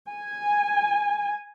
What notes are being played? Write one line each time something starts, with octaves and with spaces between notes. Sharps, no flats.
G#5